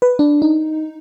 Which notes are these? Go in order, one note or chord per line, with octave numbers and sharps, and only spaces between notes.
B4
D4
D#4